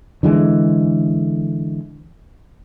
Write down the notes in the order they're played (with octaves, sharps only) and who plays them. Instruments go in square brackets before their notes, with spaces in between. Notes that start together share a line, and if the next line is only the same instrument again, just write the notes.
[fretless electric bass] D3 E3 G3 G#3